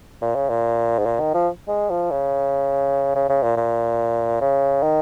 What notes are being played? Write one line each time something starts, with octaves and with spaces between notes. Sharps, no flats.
A#2
C#3
A#2
G#2
A#2
D#3
F3
G#3
F3
C#3
C#3
C#3
A#2
A#2
C#3
D#3